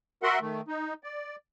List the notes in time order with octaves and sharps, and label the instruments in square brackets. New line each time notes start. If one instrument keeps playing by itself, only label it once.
[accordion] F#4 A#4 E5 F#5 C6
D#3 A3
D#4
D5